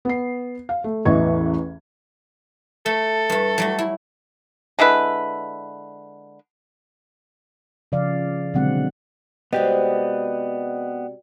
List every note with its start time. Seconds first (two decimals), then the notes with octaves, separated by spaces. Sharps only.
0.05 B3 C7
0.69 F5
0.84 A3
1.05 A1 E2 E3 D#5 C#6 G#6
2.86 A3 A4
3.30 G2 A3
3.58 F#3 G3 A3
3.79 E4
4.79 D3 G#3 E4 B4
7.92 C#3 F3 D5 F5
8.54 B2 D3 F#3 G#3 C4 F#5
9.53 C3 G#3 B3 F#4 G4 D5 D#5 G5